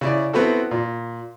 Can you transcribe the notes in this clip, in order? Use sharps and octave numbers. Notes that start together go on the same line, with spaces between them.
C#3 E4 D5
B3 C4 E4 F#4 A4
A#2